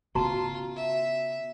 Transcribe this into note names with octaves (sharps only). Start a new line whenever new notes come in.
C#3 B3 F4 F#4 A5 A#5
E5